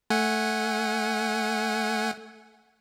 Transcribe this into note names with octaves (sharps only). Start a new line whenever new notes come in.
A3 F#5 G#5